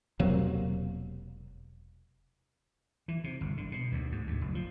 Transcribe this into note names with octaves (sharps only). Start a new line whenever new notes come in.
E1 C3 F#3 A#3
E3
C3
G1
D3
B2
D2
G#2
D2
F#1
F3